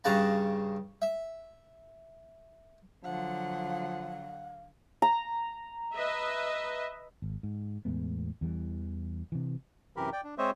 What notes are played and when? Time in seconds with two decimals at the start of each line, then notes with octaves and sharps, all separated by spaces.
0.04 G2 C#3 F#5 A5 A#5
1.02 E5
3.05 D3 F3 F#3 F5 F#5
5.02 A#5
5.94 B4 D#5 E5
7.22 G#1
7.43 G#2
7.85 E2 A2 G#3 B3
8.41 E2 E3 G3
9.32 C3 E3
9.97 F#2 C3 E3 G4 A#4 B5
10.13 D5 G5
10.24 D4
10.38 G#3 C4 C5 C#5 D#5 E5